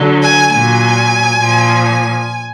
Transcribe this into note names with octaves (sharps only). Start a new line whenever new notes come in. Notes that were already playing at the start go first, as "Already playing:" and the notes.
Already playing: D3 F#3
G#5
A#2 F#3 G#5
A#2 F3